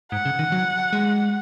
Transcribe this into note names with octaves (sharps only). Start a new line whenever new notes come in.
G#2 F#5
C#3
D#3
F#3
G#3